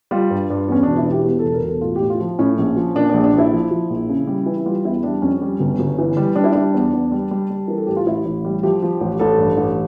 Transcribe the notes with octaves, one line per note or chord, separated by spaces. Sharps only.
G3 F4
G2
G2
E2 C#4
E1 D4
E4
E3
G4
E2 G4
A4
E1
A#4
E1
A4
A2 F4
G4
A2
F4
F3
A2 C#4
A#1
F3
A#2 D4
A#1 D4
D4
A#1
E4
F3
F3
A#1
C#3
G3
E3
G3 F4
E2 E4
G3 D4
F2 C#4
G3
G1
G1
E3
G3
G3 D4
E4
G3 D4
E2
E2
G3
G3
G3
E3 A#4
A4
A1 G4
F4
A1 E4
A1
G3
F3 G4
F3
A1
A1 A4
G2
A1